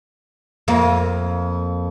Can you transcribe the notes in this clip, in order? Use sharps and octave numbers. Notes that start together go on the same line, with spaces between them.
F2 A#3